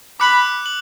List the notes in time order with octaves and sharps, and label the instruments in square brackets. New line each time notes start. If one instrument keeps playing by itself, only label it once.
[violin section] B5 [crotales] D6 F#6 C#7 F#7
[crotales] F#7